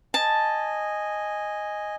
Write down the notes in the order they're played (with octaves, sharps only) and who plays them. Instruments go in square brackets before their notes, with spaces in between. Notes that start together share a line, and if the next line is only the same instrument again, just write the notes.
[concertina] D#5 G#5 [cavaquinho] A5